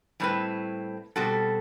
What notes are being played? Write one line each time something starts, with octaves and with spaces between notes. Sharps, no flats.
A2 G3 C4 E4 B4
B2 G3 C4 F#4 A4